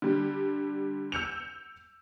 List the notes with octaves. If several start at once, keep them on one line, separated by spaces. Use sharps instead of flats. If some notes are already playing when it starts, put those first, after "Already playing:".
D3 G3
E6 G6 C#7 F7